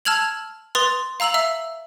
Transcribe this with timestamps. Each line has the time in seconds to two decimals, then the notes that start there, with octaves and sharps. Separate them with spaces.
0.05 A5 E6 F6 G#6 F7 F#7
0.75 B4 C6 D#6 A6 F7
1.20 F5 A#5 E6 F7 F#7
1.34 E5 E6